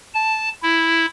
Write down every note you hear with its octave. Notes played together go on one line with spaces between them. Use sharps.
A5
E4